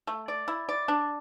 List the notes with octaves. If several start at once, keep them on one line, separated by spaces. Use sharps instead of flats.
A3
D5
E4
D5
D4